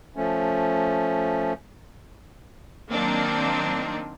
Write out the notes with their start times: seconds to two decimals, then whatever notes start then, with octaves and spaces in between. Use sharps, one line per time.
0.16 F3 A3 C#4
2.91 D#3 F#3 A#3 C4 D4 D#4